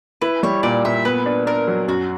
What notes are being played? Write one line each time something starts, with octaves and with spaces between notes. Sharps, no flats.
E4 B4
G3 C#5
A#2 D5
A#2 E5
B3 B4
D4
D4 A#4
F#3
F#2 F#4